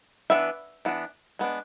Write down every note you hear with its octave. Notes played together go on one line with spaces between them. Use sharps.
E3 B3 D4 E5
E3 B3 D4
G#3 B3 D4